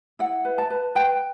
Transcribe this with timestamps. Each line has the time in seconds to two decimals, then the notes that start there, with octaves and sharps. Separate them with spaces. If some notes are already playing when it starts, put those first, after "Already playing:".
0.19 E4 F#5
0.45 B4
0.58 A5
0.70 B4
0.95 B4 G5